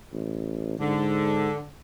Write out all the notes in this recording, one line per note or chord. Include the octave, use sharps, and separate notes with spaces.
A1
G#2 D3